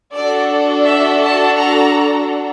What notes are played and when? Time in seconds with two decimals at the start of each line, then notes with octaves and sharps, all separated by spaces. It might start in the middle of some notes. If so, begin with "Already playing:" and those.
0.14 D4 F#4 A4 D5
0.85 E5
1.21 A5
1.57 A#5